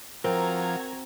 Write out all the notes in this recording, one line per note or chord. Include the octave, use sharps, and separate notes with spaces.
F3 C4 F#4 A#4 A#5 G#6